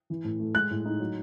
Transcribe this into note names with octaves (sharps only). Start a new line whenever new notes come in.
E3
A2
A3
G#3 F#6
A2
D#4
F#3